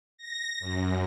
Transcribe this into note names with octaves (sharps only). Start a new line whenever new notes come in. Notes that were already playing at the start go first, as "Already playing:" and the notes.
A#6
F#2